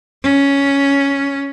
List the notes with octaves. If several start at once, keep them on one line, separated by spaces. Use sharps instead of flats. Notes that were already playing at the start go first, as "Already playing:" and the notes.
C#4